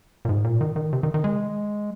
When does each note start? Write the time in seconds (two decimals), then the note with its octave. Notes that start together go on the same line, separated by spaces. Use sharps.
0.25 A#2
0.29 G#2
0.44 A#2
0.61 D#3
0.76 D#3
0.93 C3
1.03 D#3
1.14 D#3
1.24 G#3